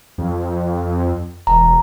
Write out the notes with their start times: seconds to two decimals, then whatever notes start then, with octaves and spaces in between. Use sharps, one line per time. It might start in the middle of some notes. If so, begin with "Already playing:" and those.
0.18 F2
1.47 E1 A#5